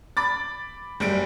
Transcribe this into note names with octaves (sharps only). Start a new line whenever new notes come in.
B5 D6 A6
F#1 G3 D7